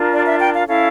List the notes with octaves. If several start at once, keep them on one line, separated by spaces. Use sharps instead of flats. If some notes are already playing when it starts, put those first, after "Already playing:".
Already playing: D4 F4 A#4
D5
E5
G5
F5
C#4 E4 A4 F5